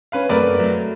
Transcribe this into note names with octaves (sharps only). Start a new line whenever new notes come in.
C#4 B4 F5
F#2 A3 C4 A#4 B4 D5
F#3 A3